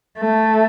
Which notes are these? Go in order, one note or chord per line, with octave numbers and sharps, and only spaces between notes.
A3